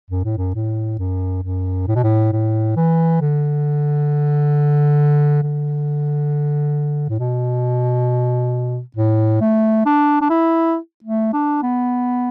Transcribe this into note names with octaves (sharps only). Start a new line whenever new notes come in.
F#2
A2
F#2
A2
F#2
F#2
A2
B2
A2
A2
E3
D3
D3
A2
B2
A2
A3
D4
D4
E4
A3
D4
B3